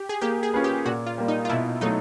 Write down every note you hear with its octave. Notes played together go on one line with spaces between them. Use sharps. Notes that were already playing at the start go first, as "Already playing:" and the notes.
Already playing: G4
G#4
A#3 G4
G#4
C#4 F4 G#4 B4
G4
A#2 F#4
F4
G3 A#3
D#4
F4
B2 E4
F#3 A3 D#4